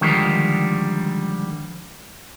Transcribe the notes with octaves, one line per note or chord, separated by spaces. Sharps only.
D3 D#3 F3 G3 G#3